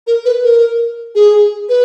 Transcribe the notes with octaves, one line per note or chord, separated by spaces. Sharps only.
A#4
B4
A#4
G#4
B4